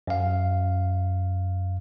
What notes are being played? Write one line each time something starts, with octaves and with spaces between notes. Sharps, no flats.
F#2 F5